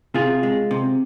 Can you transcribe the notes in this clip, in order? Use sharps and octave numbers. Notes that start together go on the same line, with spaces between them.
C3 F4 G#4
G#3
C3